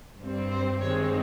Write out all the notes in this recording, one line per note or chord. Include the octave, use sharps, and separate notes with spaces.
G2 G3 C4
C5
G2 D#3 G#3 C4 C#5